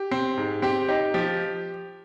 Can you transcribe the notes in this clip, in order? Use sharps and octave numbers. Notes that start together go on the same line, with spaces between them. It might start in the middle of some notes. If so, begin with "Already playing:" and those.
Already playing: G4
C4
G#2
C4 G4
D#4 G4
F3 G4